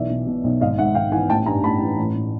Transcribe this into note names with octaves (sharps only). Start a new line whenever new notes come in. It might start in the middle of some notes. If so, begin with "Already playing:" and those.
Already playing: B1 E3 D5 E5
B2
B2
B1
G#1 D#5 F5
G#2 E5 F#5
G#1 F5 G5
E3 F#5 G#5
A1 G5 A5
G2 G#5 A#5
A1 A5 B5
E3
A1
A2